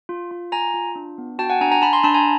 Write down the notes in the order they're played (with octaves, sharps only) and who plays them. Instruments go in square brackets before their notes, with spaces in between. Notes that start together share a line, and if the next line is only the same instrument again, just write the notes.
[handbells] F4
F4
F4 G#5 A#5
F4
D4
B3
F#4 G5 A5
F#5 G#5
D4 G#5 A#5
G#5 A#5
D4 A5 B5
A#5 C6
D4 A5 B5
G#5 A#5